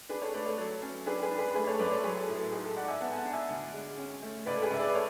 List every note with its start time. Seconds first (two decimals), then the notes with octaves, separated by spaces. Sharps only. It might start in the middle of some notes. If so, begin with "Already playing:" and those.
0.09 D4 G#4 B4
0.21 A4 C#5
0.34 A3 B4 D5
0.46 A4 C#5
0.58 F#3 A4
0.82 C#4
1.06 D4 G#4 B4
1.23 G#4 B4
1.31 D4
1.39 G#4 B4
1.55 A3 G#4 B4
1.67 A4 C#5
1.79 F#2 B4 D5
1.91 A4 C#5
2.04 F#3 G#4 B4
2.20 A4
2.27 A2
2.36 A4
2.52 G#2 G#4
2.64 A4
2.76 G#2 D5 F#5
2.88 E5 G#5
3.01 B3 F#5 A5
3.12 G#5
3.17 F#5 A5
3.25 D4
3.33 E5 G#5
3.49 D2
3.73 G#3
3.98 C#4
4.22 A3
4.46 C#2 B4 D5
4.56 A4
4.62 G#4 B4
4.70 C#2 E5
4.79 B4 D5
4.95 A4 C#5